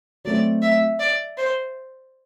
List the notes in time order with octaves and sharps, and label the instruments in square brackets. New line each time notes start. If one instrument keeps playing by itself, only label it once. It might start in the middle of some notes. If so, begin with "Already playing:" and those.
[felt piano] F#3 A3 C4 [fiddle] D5
[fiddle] E5
D5
C5